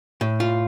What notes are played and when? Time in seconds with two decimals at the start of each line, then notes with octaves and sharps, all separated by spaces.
0.21 A2
0.40 F4